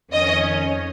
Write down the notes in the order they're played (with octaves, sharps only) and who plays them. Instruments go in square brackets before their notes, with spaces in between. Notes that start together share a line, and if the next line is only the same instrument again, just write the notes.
[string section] F2 D#3 C#4 D#5